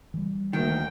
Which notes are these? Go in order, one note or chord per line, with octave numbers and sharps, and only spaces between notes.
E3 G3
D2 D#3 F#3 A#3 G5